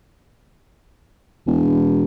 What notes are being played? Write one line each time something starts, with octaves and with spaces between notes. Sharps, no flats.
E1